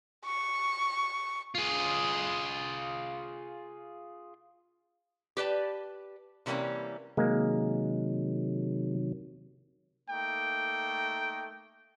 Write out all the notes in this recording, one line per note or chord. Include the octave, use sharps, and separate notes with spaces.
C#6
F4 G#4
G4 B4 D5 A5
C3 E3 G3 A3 A#3 C#4
C3 D#3 F#3 G#3 A#3
A3 A#3 D#4 G5